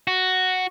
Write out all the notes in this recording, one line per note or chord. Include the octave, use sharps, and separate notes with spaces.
F#4